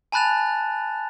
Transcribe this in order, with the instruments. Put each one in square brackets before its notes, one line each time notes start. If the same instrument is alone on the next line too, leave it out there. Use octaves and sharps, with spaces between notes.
[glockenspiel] G#5 A5 B5 F#6 A6 F7